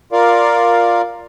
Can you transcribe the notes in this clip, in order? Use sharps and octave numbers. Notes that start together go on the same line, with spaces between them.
F4 A#4 D5 F5